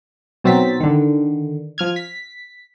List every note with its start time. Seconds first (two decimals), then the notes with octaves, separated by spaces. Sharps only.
0.44 B2 F#3 C4 D#4 A6 B6
0.80 D3 D#3
1.78 F3 F6 G#6
1.96 B6